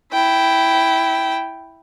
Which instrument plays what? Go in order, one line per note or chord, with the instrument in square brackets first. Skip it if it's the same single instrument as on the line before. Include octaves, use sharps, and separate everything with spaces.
[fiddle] E4 G5